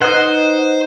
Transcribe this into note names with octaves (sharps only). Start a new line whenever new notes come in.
D#4 B4 C5 D#5 F#5